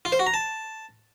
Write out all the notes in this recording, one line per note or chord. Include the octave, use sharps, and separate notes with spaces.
F4
C5
F#4
A#5
A5